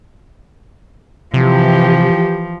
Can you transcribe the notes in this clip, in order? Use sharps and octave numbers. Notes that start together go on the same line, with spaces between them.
C3 E3 F3 G4